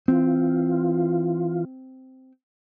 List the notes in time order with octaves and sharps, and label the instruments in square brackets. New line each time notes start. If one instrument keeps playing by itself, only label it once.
[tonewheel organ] E3 F4 [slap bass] C4